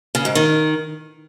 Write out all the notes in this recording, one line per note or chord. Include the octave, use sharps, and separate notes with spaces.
C#3
G#2
D#3